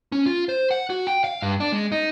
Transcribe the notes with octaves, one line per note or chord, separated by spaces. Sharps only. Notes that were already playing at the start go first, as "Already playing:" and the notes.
C#4
F4
C5
F#5
F#4
G5
F5
G2
D4
G#3
D#4